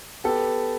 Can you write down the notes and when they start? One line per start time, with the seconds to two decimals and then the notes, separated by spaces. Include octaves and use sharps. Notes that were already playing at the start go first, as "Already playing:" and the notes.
0.24 B3 G4 A4